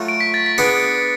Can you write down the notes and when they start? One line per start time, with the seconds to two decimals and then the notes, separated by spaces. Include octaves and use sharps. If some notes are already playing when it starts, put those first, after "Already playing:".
Already playing: F#3 A3 F4 A4
0.08 D7
0.20 B6
0.34 A6
0.46 B6
0.58 B3 D4 G#4 C#7